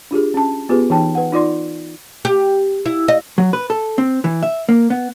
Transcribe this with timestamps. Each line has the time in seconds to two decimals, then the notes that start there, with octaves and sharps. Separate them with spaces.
0.11 D4 F4 G4 G#4
0.34 C#4 A5
0.69 B3 F4 G4 G#4 B4
0.90 E3 D#4 G5 A5
1.15 B4 F#5
1.32 D#4 F4 D5 C6
2.25 G4
2.86 E4
3.08 D#5
3.38 F#3
3.53 B4
3.70 A4
3.98 C4
4.24 E3
4.43 E5
4.69 A#3
4.90 B3